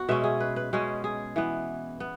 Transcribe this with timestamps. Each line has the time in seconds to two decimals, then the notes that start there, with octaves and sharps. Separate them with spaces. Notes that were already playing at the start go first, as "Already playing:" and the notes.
Already playing: B3 F#4
0.09 B2 G#3 C#4 E5
0.24 G#4
0.40 B4
0.56 B4
0.73 B2 G#3 C#4 G#4
1.04 G#4
1.36 E3 B3
2.00 B3